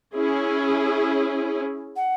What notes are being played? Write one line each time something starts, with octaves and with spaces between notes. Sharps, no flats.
C#4 E4 G#4
F#5